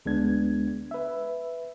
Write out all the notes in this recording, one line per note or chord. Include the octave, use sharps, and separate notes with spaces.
D2 G#3 B3 D4 G#6
B4 E5